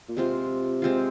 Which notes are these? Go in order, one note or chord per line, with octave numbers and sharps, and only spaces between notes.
A#2
C3 G#3 C4 F4
G#3 C4 F4